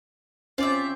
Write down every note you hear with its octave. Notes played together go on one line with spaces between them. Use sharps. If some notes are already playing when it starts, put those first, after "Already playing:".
C4 C#4 F4 C5 D5 E5